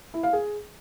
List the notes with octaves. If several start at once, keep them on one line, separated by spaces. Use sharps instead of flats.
E4
F5
G#4